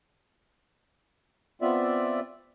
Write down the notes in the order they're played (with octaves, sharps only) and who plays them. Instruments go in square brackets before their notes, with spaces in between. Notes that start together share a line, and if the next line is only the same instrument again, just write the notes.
[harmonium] B3 C4 F4 D5 E5